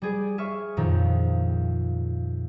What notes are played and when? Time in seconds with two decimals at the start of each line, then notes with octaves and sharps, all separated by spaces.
0.02 G3 G#4 D5
0.38 G#4 C#5 E5 C#6 F6
0.77 F2 A#2 D#3